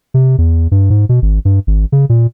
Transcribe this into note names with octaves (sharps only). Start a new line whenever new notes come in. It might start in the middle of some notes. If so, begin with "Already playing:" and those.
C3
E2
G2
G#2
B2
G#1
G2
G#1
C#3
A#2